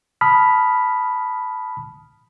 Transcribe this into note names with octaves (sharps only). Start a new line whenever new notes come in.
A5 B5 D#6 F6 B6